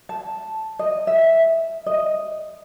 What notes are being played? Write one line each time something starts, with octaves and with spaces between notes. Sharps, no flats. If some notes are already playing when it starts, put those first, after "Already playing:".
A5
D#5
E5
D#5